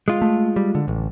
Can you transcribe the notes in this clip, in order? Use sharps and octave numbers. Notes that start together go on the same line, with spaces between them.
G#3 F4
A3
G3
D3
A1